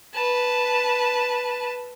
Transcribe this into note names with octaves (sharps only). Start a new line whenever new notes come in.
B4 A5